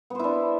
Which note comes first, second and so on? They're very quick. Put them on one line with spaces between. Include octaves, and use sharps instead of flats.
B3 C5 E4 D4